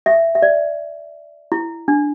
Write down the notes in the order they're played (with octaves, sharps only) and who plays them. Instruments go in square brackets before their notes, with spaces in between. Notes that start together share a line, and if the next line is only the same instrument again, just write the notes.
[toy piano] E5
E5
D5
E4
D4